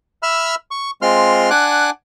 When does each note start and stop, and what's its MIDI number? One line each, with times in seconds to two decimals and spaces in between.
0.23 0.55 76
0.23 0.55 83
0.23 0.55 88
0.23 0.55 89
0.71 0.91 85
1.02 1.50 56
1.02 1.50 60
1.02 1.50 65
1.02 1.50 84
1.02 1.50 89
1.50 1.90 62
1.50 1.90 78
1.50 1.90 80
1.50 1.90 86
1.50 1.90 90